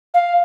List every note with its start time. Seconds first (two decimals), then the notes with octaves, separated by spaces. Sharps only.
0.14 F5